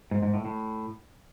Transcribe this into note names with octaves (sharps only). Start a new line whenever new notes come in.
G#2
G#2
A2
A2